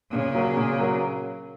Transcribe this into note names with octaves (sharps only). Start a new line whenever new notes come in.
A#2 C#3
F#3 A#3
A#2
F#3 A#3